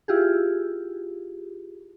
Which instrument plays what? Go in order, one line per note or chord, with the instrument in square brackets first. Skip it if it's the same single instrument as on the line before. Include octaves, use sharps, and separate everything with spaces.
[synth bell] E4 F4 G4 G#4